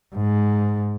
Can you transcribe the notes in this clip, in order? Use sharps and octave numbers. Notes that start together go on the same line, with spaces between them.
G#2